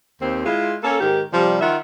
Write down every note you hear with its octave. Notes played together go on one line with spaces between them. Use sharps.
D#2 C4
G#3 E4 F4
A#3 C#4 A4
G#2 D#3 G4 A#4
C3 F3 G3
D#3 F4 E5 F#5